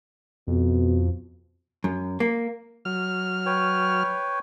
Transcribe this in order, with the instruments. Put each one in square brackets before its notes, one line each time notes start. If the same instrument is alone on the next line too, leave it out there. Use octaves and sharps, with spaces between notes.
[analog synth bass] F2 [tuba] B2
[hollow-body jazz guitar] F#2
A#3
[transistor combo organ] F#3 F6
[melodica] B4 C#5 G5